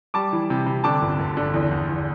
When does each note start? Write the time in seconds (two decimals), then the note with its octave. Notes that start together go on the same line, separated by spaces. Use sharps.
0.14 G3 A5 D6
0.33 E3
0.50 C3
0.66 C3
0.84 D3 A5 D6
1.02 G1
1.19 G1
1.37 D3
1.54 E2
1.71 E2
1.89 E2